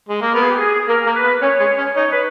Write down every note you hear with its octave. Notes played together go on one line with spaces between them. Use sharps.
G#3
A#3
B3 A#4
G#4
G4
G#4
A#3 A#4
A#3
B4
B3
C#4 C#5
G#3
C#4
D#4 C#5
B4